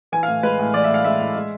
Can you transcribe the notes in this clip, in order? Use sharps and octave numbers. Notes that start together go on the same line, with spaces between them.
E3 G#5
A2 F5
G#3 B4
A2
E3 D5
A2 E5
F5
G#3 E5
A2
G#3